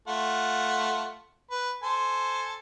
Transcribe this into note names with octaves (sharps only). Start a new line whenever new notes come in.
A3 F4 F#5
B4
A4 C5 G#5